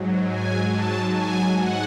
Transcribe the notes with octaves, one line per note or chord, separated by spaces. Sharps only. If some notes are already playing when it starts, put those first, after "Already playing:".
Already playing: G#2 F#3
G#5
A5
G#5
G#2 F#5